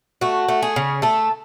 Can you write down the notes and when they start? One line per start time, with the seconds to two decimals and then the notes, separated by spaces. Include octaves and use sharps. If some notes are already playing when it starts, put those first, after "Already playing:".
0.21 A3 F#4
0.48 A3
0.62 G#4
0.76 C#3
1.02 A3 A4